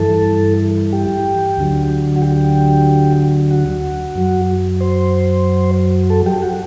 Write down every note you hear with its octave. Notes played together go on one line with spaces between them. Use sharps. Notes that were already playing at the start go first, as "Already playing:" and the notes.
Already playing: G2 E3 A4
G4
D2 D3 F#3
F#4
G4
F#4
F#2 F#3
C5
A4
G4
F#4